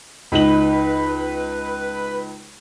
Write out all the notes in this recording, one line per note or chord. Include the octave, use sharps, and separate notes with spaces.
C#2 D#4 B4 F#7